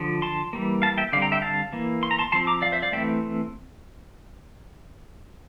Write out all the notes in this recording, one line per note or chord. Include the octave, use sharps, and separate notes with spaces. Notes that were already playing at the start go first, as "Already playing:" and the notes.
Already playing: D3 F3
A5 C6
E3 G3 A#3
F5 A5
E5 G5
D3 G3 C4 D5 F5
G5 A#5
E5 G5
F5 A5
E3 A#3
C6
A#5
A5 C6
F3 C4 A5 C6
A#5 D6
D5 F5
C5 E5
D5 F5
E3 A3 C4 E5 G5